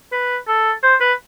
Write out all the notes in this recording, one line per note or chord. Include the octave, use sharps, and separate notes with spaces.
B4
A4
C5
B4